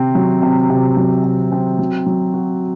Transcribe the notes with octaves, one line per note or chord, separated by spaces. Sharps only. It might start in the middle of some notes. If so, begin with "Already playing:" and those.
Already playing: C3 C4
F#3
C3
C3
F#3
C3
C4
F#3
F#3
F#4